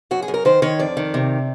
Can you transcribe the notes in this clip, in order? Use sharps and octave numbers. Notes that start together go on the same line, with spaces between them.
F#2 F#4
G#4
F#2
A#4
D#3 C5
D#3 C#5
F2 D5
D#3
C3